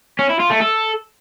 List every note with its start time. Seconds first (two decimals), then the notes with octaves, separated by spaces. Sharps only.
0.19 C#4
0.29 E4
0.40 F4
0.50 A3
0.61 A4